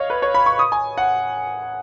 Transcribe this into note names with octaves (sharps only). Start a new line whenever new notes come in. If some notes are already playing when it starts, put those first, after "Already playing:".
Already playing: C#5 D#5 F5
B4
C#5
B5
C#6
D#6
G#5
F#5